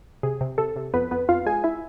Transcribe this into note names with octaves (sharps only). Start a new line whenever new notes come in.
C3 G#4
C3
C3 A4
C3
F2 B3 B4
F2 B3 B4
F2 F4 F5
G#3 G#4 G#5
E4 E5